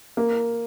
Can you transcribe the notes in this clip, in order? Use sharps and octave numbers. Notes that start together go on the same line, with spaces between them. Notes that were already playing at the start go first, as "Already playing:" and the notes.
A#3